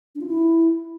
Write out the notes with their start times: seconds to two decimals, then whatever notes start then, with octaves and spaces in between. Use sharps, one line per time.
0.15 D4
0.21 F4
0.27 E4